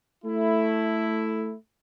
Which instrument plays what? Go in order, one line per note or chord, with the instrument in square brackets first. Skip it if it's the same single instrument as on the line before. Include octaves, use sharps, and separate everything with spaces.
[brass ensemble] A3 E4